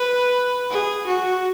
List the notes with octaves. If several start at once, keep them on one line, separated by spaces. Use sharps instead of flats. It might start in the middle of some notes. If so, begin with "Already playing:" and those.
Already playing: B4
G#4
F#4